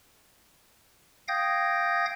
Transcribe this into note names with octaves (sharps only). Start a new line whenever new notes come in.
F5 G5 D#6 G6 G#6 A#6